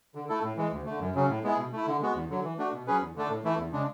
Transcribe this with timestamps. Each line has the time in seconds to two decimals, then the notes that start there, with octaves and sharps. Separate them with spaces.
0.15 D3
0.29 A3 E4 A4
0.43 A2
0.57 E3 G#3
0.72 D2
0.86 D3 A3
1.00 F#2
1.15 C#3 F#3 C#4
1.29 A2
1.44 G#3 B3 E4 G#4
1.58 B2
1.72 A3 E4
1.87 D3
2.01 G#3 B3 F#4
2.15 E2
2.30 D3 F#3
2.44 E3
2.58 A3 D4 F#4
2.73 B2
2.87 F#3 C#4 G#4 B4
3.01 E2
3.15 D3 A3 D4 A4
3.30 A2
3.44 E3 A3 E4
3.59 E2
3.72 C#3 G#3 D4